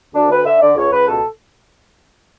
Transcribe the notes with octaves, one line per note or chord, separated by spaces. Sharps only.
D2 D4
D2 B4
D3 E5
D3 D5
C#2 C#5
C#2 B4
B2 A4